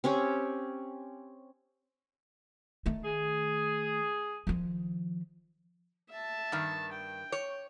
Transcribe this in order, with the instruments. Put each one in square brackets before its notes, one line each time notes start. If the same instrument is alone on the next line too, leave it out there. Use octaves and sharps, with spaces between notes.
[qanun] C4 C#4 G4 C#5
[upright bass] D#3 A3
[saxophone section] G#4
[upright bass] D#3 F3
[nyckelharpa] E5 A5
[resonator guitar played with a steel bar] G2 D#3
[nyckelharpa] G5
[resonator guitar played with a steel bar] C#5